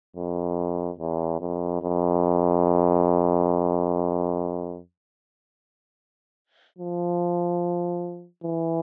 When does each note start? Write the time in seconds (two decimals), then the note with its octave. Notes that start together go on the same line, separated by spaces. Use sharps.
0.16 F2
0.99 E2
1.41 F2
1.82 F2
6.78 F3
8.44 E3